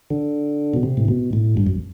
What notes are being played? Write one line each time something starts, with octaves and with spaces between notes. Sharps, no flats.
D3
B2
C3
A2
B2
A2
G2
F#2